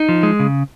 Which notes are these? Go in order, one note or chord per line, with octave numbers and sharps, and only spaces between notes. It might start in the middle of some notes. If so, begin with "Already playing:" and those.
Already playing: D#4
F3
G#3
C#3